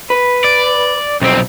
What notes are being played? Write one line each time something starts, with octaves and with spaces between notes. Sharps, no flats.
B4
D5
B1 F2 C3 C4